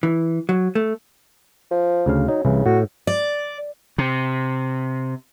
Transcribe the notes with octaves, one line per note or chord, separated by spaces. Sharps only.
E3
F#3
A3
F3
D2 C#3 F5
F#3 D#4
C2 C#3 E3
A2 F#4
D5
C3